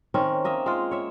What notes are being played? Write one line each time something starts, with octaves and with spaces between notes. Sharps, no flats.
D#3 C4 C#4
A#3 D#5 E5
G#3 F4
C#5 E5